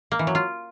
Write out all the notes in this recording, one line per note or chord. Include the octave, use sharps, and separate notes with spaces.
A#3
E3
F#3
F4